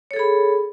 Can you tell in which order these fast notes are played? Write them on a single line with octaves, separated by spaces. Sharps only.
C#5 A4 G#4 B5